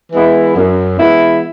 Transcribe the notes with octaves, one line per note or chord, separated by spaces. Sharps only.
E3 G#3 B3 E4
F#2
E3 G#3 B3 E4